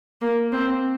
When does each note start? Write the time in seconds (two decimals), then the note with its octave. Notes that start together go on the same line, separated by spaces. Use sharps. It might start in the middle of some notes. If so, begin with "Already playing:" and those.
0.22 A#3
0.53 C4